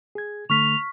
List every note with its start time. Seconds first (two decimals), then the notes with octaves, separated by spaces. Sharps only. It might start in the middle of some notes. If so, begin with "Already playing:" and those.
0.15 G#4 G#6
0.50 D3 A3 C#6 F6 B6 F7